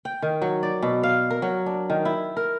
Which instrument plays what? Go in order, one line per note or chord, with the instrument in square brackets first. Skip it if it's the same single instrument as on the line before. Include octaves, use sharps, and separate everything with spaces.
[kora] G5
D#3
F#3
D5
B2
F5
A#4
F#3
D4
D#3
E4
A#4